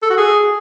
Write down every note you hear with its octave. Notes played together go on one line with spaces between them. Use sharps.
A4
F#4
G#4